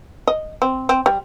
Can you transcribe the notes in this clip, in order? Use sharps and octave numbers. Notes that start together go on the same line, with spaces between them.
D#5
C4
C4
G3